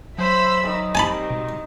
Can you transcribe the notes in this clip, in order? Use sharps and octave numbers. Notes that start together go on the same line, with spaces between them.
F#3 C5 E5 B5 E6
D#3
G3 C4 G#5 A5 B5
B2